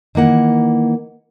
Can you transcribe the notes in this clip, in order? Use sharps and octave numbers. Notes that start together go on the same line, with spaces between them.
D#3 E3 A#3 F#5